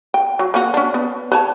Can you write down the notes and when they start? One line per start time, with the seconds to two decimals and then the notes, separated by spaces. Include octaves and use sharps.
0.14 G5
0.39 F#3
0.54 A#3 C#4 F#4
0.74 C#4 D4
0.94 B3
1.32 B4 C#5 A5